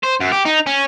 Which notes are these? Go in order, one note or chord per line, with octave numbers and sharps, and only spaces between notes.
C5
F#2
G4
D#4
C#4